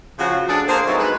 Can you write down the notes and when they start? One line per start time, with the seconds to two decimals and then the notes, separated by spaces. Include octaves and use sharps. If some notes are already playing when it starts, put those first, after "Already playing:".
0.18 C#3 F3 F#4
0.48 D4 G#4 A4
0.67 A#3 G#4 C5
0.86 F#3 G3 A3 B3 C4 D#4
0.98 G#3 B4